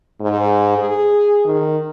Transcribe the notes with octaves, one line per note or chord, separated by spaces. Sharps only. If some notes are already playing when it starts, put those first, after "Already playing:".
G#2
G#4
D#3